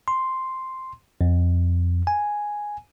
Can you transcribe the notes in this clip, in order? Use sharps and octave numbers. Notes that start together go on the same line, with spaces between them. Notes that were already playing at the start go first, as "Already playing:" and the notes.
C6
F2
G#5